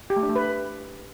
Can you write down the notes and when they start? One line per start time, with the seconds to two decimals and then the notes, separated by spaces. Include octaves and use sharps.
0.10 G4
0.16 A3
0.23 D4
0.29 A3
0.36 B4